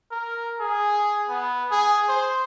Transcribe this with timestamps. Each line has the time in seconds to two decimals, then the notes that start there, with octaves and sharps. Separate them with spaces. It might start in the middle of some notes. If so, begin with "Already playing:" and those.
0.11 A#4
0.60 G#4
1.29 B3
1.71 G#4
2.09 C5